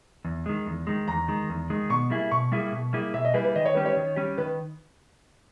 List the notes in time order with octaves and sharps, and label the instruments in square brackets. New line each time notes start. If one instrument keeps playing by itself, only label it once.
[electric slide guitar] E2
D#3 G#3
E2
D#3 G#3
[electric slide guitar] E2 [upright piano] A#5
[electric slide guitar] D#3 G#3
E2
D#3 G#3
[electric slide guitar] B2 [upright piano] C#6
[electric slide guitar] G3 A#3 E4 G#4
[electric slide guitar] B2 [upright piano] C#6
[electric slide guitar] G3 A#3 E4 G#4
B2
G3 A#3 E4 G#4
[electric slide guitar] B2 [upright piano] E5
[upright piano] D#5
[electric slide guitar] G3 A#3 E4 G#4 [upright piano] B4
[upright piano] B4
[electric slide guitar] D#3 [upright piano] D#5
[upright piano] C#5
[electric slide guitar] G3 C#4 G4 [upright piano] B4
[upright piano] C#5
[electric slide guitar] D#3
G3 C#4 G4
[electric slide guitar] D#3 [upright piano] B4